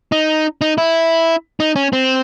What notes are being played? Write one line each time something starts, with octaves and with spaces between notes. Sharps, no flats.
D#4
D#4
E4
D#4
C#4
C4